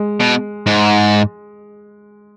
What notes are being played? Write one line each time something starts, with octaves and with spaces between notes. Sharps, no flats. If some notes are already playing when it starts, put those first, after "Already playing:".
Already playing: G#3
B2
G#2